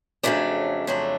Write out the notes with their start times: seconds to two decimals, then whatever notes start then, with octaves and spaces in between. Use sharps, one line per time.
0.23 F2 C#3 F#3 A3 D4
0.87 F2 C#3 F#3 A3 D4